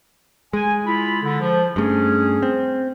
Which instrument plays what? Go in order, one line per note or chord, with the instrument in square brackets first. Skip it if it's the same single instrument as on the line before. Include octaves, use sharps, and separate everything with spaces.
[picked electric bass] G#3 [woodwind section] G#5
[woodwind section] E4 F4 B5
D3
F3
[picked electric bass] G2 A3 [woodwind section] C#4 G#4
[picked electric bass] C4